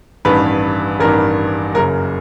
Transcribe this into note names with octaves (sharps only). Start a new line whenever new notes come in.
A1 G2 D#3 B4
A1 G2 D#3 A#4
F#1 F#2 C#3 A#4